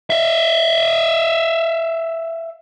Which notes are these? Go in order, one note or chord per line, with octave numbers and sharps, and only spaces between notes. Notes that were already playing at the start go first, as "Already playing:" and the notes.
E5 F5